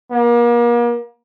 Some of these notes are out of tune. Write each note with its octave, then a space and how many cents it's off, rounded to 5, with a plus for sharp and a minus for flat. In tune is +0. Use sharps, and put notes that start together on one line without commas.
A#3 +35